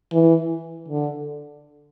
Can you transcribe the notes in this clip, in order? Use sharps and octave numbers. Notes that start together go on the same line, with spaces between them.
E3
D3